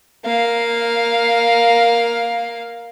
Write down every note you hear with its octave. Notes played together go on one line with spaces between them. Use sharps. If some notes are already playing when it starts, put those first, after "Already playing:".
A#3 F5